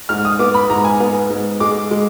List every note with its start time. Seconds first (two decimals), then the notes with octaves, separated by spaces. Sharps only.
0.09 G#2 F6
0.25 D#6
0.39 B3 D6
0.54 B5
0.70 G#2 A#5
0.84 G#5
1.00 B3
1.30 G#2
1.60 G#3 D6
1.91 G#3